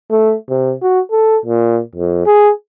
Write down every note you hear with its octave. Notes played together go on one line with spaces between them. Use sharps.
A3
C3
F#4
A4
A#2
F2
G#4